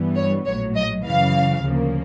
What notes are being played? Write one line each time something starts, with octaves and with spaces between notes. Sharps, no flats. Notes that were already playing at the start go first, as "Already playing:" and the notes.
Already playing: G2 E3 G3 B3
C#5
A#1 A2 F#3 C#5
D#5
F#2 C#3 E3 F5
D2 C#3 F3 A#3